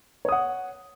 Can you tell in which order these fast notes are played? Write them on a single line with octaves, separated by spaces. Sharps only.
C#5 D#6 F#5